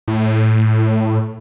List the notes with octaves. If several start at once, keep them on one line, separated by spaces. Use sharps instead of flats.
A2